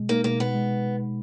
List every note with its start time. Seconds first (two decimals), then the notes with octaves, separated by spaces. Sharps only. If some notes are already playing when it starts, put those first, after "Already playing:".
Already playing: B2 G#3
0.09 A#3 D#4
0.24 B2 A#3
0.40 B2 B3
0.55 G#3